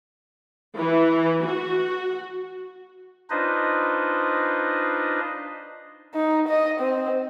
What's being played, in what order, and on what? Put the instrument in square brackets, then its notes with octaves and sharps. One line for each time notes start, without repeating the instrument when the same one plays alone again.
[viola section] E3
F#4
[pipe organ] D4 D#4 F4 B4 C5 D#5
[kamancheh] D#4
D#5
C4